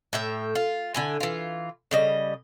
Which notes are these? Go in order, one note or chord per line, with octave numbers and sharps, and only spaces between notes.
A2 E5 G5
F4
D3 E4 G#5
E3 F4
C#3 G3 D#5